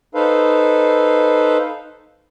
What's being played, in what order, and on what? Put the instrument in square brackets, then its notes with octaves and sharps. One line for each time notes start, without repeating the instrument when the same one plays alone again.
[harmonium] D#4 A4 B4 C5 F5